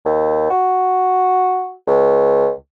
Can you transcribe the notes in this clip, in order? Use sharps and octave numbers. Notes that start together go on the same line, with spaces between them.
D#2
F#4
C#2